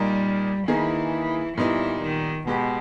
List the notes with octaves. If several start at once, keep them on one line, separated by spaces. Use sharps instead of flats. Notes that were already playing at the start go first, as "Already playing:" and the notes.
Already playing: A#2 G3 A#3 D#4 A#4
D#3 E3 A#3 D#4 G#4
A#2 E3 G3 B3 D#4
D#3
B2 G#3 B3 G4